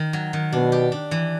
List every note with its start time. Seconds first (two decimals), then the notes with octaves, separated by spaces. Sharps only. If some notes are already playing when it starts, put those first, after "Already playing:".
Already playing: D#3
0.13 F#3
0.33 D#3
0.52 B2 D4
0.72 G4
0.92 D4
1.11 E3